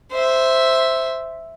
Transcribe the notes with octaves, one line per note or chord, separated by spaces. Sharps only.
C5 E5